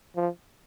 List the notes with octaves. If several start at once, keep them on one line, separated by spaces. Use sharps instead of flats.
F3